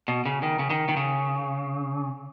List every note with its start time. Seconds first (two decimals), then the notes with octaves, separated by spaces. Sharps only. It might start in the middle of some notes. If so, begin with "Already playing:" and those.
0.08 B2
0.26 C#3
0.43 D#3
0.59 C#3
0.70 D#3
0.89 D#3
0.97 C#3